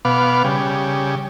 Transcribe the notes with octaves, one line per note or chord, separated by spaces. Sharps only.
B2 B3 F5 D6
C#3 G3